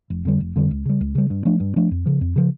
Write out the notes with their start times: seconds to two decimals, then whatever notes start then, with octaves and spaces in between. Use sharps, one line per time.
0.10 F1
0.25 F2 D3 G3
0.40 F1
0.56 F2 D3 G3
0.71 C#2
0.85 C#3 G3
1.01 C#2
1.15 C#3 G3
1.30 G2
1.45 F3 A3 D4
1.60 G2
1.76 F3 A3 D4
1.91 F2
2.06 C#3 F3
2.21 F2
2.36 C#3 F3